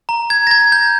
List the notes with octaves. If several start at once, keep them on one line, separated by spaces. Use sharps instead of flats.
A#5
G#6
A#6
A#5 G#6
G6